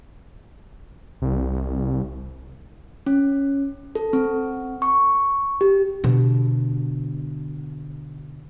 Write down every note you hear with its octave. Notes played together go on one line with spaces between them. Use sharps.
C2
C#4
A4
C4
C#6
G4
B2 D3